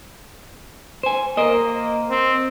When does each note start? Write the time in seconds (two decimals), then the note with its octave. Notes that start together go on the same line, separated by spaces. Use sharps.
1.03 C5 G#5
1.37 A#3 A#4 C5 D#5
2.10 C4